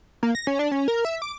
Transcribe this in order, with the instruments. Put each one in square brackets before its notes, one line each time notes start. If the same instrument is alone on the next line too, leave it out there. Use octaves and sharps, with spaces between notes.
[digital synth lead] A#3
A#6
C#4
D4
C#4
A#4
E5
D6